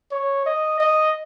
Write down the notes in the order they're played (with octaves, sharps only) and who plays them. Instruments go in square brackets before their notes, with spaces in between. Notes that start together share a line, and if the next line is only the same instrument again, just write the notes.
[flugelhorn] C#5
D#5
D#5